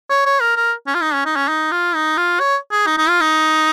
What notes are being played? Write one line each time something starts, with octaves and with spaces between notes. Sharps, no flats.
C#5
C#5
A#4
A#4
C#4
F4
D#4
C#4
D#4
C#4
D#4
F4
D#4
F4
C#5
G#4
D#4
D#4
F4
D#4